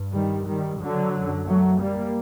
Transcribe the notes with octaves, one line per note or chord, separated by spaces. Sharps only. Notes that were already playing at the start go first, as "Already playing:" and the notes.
Already playing: G2
D#3 G3
D#3 G3
D3 F#3
F#2
F#3 A3
G3 A#3